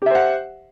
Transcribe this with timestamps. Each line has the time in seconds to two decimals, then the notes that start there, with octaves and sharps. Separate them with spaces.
0.02 G4
0.06 E5
0.11 C5
0.15 F#5